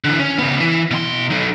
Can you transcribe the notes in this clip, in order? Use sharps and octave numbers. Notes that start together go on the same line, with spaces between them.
D3 E3
C#4
C#3 B3
E3
B2 C6
F#3 D#4